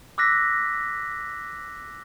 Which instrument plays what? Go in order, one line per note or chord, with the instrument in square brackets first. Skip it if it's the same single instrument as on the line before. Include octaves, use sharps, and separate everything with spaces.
[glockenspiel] D6 E6 F#6 A#6 B6